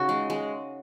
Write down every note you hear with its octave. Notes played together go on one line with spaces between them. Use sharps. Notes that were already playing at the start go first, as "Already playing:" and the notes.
Already playing: C#3 D#4 F#4
G#3
G#3